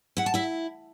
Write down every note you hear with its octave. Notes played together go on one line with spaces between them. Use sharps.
E4 F#5
A5
E4 E5